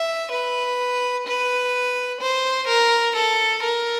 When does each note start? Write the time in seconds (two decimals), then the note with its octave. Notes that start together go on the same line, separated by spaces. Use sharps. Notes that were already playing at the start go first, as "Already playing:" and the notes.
Already playing: E5
0.32 B4
1.28 B4
2.21 C5
2.68 A#4
3.16 A4
3.63 A#4